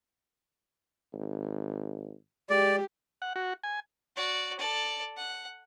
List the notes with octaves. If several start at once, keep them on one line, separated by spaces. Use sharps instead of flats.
G#1
G#3 G4 D5
F#5
F#4
G#5
F#4 D5
A4 D5
F#5